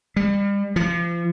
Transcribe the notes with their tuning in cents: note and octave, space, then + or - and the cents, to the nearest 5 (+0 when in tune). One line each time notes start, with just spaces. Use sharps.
G3 +40
F3 -35